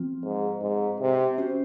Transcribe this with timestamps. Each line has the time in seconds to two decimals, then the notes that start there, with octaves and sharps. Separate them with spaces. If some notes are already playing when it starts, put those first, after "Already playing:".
Already playing: F3 C4 F4
0.24 G#2
0.62 G#2
1.00 C3
1.38 C#4 F#4 C5